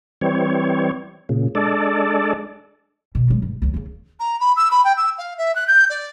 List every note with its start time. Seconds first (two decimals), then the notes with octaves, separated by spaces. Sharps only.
0.21 E3 G3 C4 C#5
1.29 A#2 C#3
1.55 G#3 D4 A4 D5
3.15 B2
3.28 F#3 G#3
3.42 G2
3.62 D2 F#3
3.74 D#2 C#3
4.19 A#5
4.40 B5
4.56 E6
4.71 B5
4.84 G5
4.97 E6
5.18 F5
5.38 E5
5.55 F#6
5.67 G6
5.89 D5